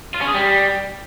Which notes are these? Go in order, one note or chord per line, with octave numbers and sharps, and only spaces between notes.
F4
C#4
G#4
G3